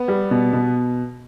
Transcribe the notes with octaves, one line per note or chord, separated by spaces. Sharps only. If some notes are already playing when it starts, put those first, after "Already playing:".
Already playing: B3
G3
B2
B2